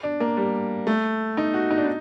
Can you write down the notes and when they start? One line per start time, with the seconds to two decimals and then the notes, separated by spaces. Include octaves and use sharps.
0.03 D4
0.20 A#3
0.37 G3
0.87 A3
1.37 D#4
1.54 F#4
1.70 D#4
1.78 D4
1.85 D#4